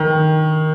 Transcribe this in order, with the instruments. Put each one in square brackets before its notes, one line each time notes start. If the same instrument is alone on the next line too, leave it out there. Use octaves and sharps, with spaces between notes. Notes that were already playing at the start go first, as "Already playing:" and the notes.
Already playing: [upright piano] D#3